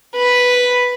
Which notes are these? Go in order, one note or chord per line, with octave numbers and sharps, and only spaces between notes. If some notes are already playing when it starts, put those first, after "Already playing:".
B4